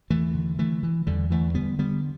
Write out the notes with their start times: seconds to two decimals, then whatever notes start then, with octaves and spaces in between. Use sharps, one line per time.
0.10 E2 E3 A3
0.35 D3
0.58 D3 E3 A3
0.83 D3 E3
1.07 E2 D3 G3
1.30 E2 E3 A3
1.54 D3 G3 B3
1.79 D3 G3 B3